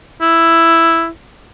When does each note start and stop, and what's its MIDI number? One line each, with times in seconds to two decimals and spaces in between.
0.22 1.08 64